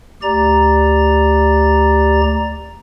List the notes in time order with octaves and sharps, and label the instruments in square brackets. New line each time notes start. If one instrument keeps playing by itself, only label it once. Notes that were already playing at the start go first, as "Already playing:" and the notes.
[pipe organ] D2 G4 D5 A#5 A6